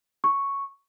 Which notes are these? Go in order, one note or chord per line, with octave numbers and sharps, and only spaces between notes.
C#6